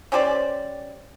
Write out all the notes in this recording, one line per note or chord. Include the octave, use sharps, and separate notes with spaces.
C#4 G4 C5 D5